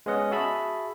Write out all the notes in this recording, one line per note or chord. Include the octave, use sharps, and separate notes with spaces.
G#3 B3 C#4 D#5 F#5
F#4 G#4 E5 A5 B5